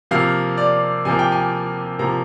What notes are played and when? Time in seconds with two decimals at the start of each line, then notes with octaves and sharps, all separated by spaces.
0.11 C3 F3 A#3 F5
0.58 D5
1.05 C3 F3 A#3 G#5
1.19 G5
1.32 G#5
1.99 C3 F3 A#3 A#5